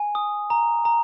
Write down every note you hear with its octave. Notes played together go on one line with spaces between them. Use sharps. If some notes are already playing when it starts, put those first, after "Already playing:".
Already playing: G#5
D#6
A#5
A#5